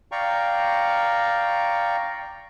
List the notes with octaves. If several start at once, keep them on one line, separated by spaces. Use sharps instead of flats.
D5 F5 G5 A#5 C#6